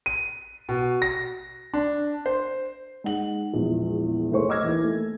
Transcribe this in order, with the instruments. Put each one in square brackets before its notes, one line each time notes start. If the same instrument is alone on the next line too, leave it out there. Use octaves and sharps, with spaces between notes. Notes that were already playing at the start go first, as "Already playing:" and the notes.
[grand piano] D#7
B2
A#6
D4
C5
[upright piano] G#3 D#4 F#5 F#7
A#1 E2 G#3
F#1 A3 G#4 C5 C#5 C#6
D#5 D6 E6 F6 G#6 A#6
D#2 E3
A3